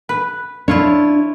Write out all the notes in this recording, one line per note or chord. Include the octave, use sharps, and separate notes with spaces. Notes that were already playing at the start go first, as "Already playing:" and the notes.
B4
D4 E4 F4 C#5